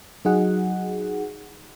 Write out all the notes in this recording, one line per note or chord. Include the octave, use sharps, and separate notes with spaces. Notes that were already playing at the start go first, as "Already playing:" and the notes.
F#3 D#4 F#4 G#4 F#5